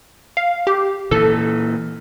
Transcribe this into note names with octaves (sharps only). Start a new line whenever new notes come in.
F5
G4
A#2 E3 A4